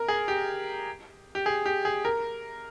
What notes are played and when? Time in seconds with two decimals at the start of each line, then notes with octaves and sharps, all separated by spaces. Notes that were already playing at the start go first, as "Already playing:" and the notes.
Already playing: A#4
0.08 G#4
0.28 G4
1.35 G4
1.46 G#4
1.66 G4
1.85 G#4
2.05 A#4